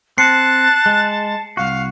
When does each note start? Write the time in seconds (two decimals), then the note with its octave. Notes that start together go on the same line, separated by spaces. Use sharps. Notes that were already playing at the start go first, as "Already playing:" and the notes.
0.18 C4 A5 F#6 C7 C#7
0.86 G#3
1.57 C2 F#4 F5